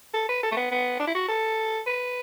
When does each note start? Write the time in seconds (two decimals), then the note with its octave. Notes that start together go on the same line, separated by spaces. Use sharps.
0.14 A4
0.29 B4
0.43 A4
0.51 A3
0.57 B3
0.71 B3
1.00 D4
1.07 E4
1.15 F#4
1.28 A4
1.87 B4